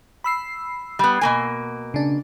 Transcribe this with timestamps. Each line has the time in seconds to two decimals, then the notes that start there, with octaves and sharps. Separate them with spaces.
0.24 B5 E6 C7
0.99 G3 B3
1.21 B2 A#3 G#5
1.94 C#3 D4